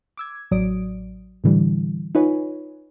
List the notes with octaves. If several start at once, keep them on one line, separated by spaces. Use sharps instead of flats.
D6 E6 G#6
A1 F#3 D5 D#6 D7
A2 D3 E3 G3
D#4 F4 B4 C#5 G#5